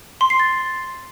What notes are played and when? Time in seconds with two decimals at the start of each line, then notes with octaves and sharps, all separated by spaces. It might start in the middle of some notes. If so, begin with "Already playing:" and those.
0.21 C6
0.30 C7
0.40 A6